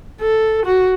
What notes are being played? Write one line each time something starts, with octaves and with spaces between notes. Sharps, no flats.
A4
F#4